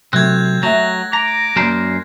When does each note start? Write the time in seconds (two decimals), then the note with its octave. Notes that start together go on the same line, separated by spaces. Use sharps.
0.13 C3 F#3 A3 C4 F#6 G#6
0.63 F#3 A3 E5 G5 A#6
1.13 A#5 D6
1.56 F#2 A#3 A#4 C5 D5 B5